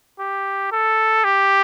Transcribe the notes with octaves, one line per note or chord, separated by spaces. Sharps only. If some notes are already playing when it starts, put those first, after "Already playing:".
G4
A4
G4